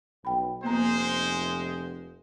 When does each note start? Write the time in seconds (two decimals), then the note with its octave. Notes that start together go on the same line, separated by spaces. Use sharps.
0.25 B1 G5 B5
0.64 F1 G#3 A#3 B3 C5 A#5